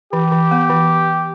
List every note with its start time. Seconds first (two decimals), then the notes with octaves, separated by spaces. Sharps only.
0.13 E3 G4
0.32 E3
0.51 B3
0.70 E3